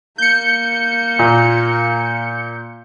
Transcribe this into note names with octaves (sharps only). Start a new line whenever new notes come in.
A#3 G6 C#7
A#2